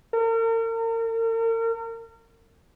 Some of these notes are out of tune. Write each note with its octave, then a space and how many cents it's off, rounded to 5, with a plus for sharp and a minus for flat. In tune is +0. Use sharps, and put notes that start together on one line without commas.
A#4 -40